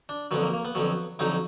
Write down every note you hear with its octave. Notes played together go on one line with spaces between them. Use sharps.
D4
F2 D3 F#3 B3
A#3
A#3
B3
F2 D3 F#3
F2 D3 F#3 D#4